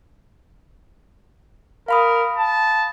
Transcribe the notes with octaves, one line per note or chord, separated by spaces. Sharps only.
A#4 F5 B5 D#6
A5